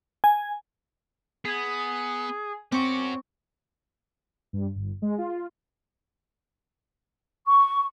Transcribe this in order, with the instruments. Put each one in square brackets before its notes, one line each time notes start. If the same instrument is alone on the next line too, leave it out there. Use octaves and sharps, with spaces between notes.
[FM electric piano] G#5
[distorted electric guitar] B3 [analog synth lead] G#4
[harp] C4 C#6 [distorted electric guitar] C#4 F#4 [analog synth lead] D6
[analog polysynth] G2
G1
G#3
F4
[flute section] C#6